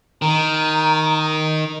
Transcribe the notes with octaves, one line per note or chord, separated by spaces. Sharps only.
D#3 A#5